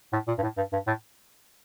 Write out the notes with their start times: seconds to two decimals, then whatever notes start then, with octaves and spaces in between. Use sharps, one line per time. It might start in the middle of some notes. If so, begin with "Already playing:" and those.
0.13 A2
0.28 A#2
0.38 G2
0.42 A2
0.57 G2
0.73 G2
0.87 A2